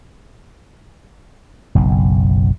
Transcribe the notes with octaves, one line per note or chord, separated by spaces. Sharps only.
F#1 B1